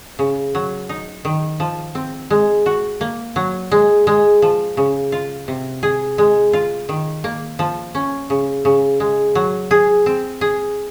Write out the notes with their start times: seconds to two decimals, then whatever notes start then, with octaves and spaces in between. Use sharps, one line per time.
0.19 C#3
0.55 F#3
0.89 D#4
1.25 D#3
1.60 F3
1.95 C4
2.30 G#3
2.66 F#4
3.01 A#3
3.36 F#3
3.72 G#3
4.07 G#3
4.42 F3
4.77 C#3
5.12 F4
5.48 C3
5.83 G#4
6.18 G#3
6.53 F4
6.89 D#3
7.24 A#3
7.59 F3
7.95 C#4
8.30 C#3
8.65 C#3
9.00 G#3
9.35 F#3
9.71 G#4
10.06 C4
10.41 G#4